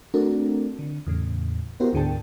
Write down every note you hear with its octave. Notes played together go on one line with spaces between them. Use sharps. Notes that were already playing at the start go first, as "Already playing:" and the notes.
A3 C4 D4 F#4 A4 A#4
D3
E2 A2 C#3
B3 E4 F#4 G4 A#4 C5
D2 G#2 D3 G#4 G5 A5